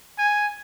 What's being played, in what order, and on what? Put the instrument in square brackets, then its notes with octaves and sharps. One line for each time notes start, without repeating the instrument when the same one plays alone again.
[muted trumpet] G#5